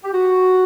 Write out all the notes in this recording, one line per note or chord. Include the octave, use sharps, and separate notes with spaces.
G4
F#4